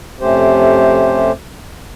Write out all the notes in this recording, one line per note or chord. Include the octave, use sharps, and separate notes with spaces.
F2 C3 A3 C#4 G4 C5